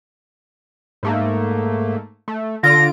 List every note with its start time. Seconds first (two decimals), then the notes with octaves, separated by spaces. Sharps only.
1.03 G#2 A3 A#3
2.28 A3
2.63 D3 F4 A#6 D7